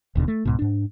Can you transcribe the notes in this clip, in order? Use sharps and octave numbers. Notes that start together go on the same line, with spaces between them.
D#1 D#2 B2 D3
A3
C#2 G#2 B2
G#2 D4